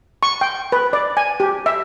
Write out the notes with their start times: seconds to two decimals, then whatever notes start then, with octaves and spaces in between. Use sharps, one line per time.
0.23 C#6
0.41 G5
0.72 B4
0.93 D5
1.17 G#5
1.40 G4
1.66 E5